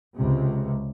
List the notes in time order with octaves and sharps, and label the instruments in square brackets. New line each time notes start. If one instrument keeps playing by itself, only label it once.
[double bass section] C#2 C3